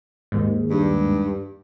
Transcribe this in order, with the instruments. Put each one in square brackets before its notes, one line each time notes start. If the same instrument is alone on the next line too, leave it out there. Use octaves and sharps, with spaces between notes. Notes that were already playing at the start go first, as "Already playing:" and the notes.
[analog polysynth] D#2 G#2
[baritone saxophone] G2